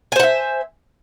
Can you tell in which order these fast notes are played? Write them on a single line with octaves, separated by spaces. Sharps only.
G#5 C5 F#5 E5